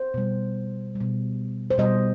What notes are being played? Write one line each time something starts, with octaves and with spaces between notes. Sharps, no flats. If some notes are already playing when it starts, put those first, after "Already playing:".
Already playing: C5
B2 G3
B2 G3
C5
B2 G3 D#5